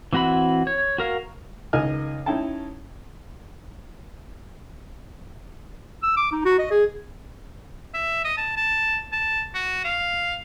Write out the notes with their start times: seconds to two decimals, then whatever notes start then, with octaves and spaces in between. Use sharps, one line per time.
0.13 E3 C4 F#4 F#5 B5
0.67 C#5
0.98 F#4 A#4 F5
1.73 C#2 D#3 D#5 G#5 F6
2.26 C#4 D#4 E4 G5 A5
6.03 E6
6.17 D6
6.32 D#4
6.45 F#4
6.59 D#5
6.71 G#4
7.94 E5
8.24 D#5
8.38 A5
8.57 A5
9.12 A5
9.54 F#4
9.85 F5